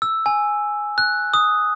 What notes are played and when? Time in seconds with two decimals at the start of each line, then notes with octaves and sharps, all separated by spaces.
0.02 E6
0.26 G#5
0.98 F#6
1.34 D#6